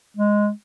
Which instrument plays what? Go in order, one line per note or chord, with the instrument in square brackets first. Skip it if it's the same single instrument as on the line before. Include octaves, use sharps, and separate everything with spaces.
[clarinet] G#3